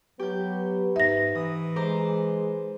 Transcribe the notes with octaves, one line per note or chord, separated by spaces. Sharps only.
F#3 B3 G4 G6
G#2 D#4 E5 A#6
E3 D#6
G#3 C5 A#5 D6